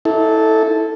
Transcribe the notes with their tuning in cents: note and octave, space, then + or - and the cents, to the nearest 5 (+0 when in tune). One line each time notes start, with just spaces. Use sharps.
E4 -30 A4 +0